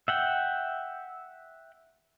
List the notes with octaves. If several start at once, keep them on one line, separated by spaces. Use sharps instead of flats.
E5 F#5 G5